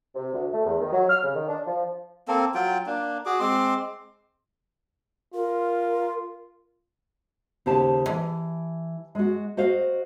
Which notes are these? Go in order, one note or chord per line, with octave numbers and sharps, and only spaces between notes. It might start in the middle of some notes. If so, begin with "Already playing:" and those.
C3
D2
A3
E2
D#3
F#3
F6
C#3
D#3
D4
F3
A#3 C4 A4
F#3 F4 G5
A#3 D4
F#4 G#4 D6
G#3 C4 C6 D6
F4 A#4
D#2 C#3 G4 C5 A5
E3
G#3 F#4
F#4 C5 D#5 F5